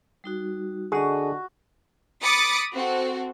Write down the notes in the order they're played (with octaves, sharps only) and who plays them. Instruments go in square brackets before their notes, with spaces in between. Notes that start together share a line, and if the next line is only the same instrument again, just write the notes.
[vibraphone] G3 D#4 F#4
[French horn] D3 [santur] F#4 [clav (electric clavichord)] G#4 [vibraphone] D#5 A5
[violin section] B5 D6 D#6 A6 C#7
C4 F#4 A4